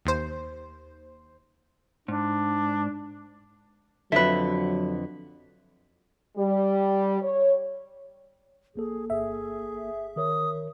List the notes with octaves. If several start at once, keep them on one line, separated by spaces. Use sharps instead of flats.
D#2 C5
G#2 D4
F2 D3 F#3 B4 E5
G3
C#5
A#1 A#3 G#4 A4
G1 G#4 E5
D#3 A#4 C#5 D#6